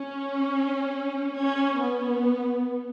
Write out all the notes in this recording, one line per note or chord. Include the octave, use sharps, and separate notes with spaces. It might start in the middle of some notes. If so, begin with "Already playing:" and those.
Already playing: C#4
C#4
B3